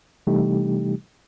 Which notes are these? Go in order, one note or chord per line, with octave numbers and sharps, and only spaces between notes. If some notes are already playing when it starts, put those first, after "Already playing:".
C3 E3 G3 A3 D#4 G4